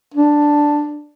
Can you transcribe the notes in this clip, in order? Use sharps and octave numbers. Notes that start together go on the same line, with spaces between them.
D4